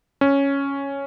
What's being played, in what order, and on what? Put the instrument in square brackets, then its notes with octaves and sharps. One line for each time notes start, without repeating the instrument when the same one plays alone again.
[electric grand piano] C#4